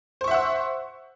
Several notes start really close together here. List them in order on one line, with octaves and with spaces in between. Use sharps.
C5 C#6 E5 F#5 E6